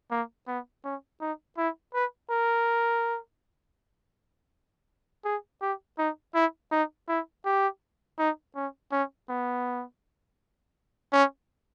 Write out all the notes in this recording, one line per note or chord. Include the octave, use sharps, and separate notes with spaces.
A#3
B3
C#4
D#4
E4
B4
A#4
G#4
G4
D#4
E4
D#4
E4
G4
D#4
C#4
C#4
B3
C#4